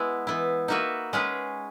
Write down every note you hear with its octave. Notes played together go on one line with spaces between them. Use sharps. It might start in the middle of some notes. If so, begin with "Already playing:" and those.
Already playing: G#3 B3 E4 F#4
E3 B3 E4
A#3 D#4 F#4 B4 E5
G#3 C#4 G#4 B4